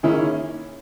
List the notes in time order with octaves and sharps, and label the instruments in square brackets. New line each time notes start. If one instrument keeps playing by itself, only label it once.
[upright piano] D#3 A#3 C#4 E4 G#4